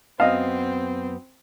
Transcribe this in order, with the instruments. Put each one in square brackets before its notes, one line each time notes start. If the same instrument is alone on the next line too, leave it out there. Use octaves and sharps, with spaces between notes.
[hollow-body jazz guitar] F#2 B3 A5 [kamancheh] C4 [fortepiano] D#5 F5